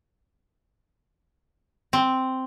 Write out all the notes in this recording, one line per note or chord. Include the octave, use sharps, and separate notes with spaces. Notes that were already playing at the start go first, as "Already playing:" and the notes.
C4